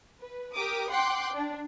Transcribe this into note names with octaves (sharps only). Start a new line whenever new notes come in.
B4
G4 A#4 D6 D#6
F#5 G5 C6 D6 F#6
D4